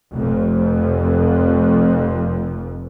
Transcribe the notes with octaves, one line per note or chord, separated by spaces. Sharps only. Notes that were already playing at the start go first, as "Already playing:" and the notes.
F1 F2